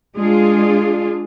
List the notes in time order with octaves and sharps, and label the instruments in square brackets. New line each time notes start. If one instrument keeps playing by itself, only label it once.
[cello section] G#3 D4 F4 G#4